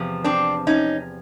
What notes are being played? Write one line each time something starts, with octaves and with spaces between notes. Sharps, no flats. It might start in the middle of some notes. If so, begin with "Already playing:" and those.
Already playing: E2 C3 F3
C4 D4
C#4 D#4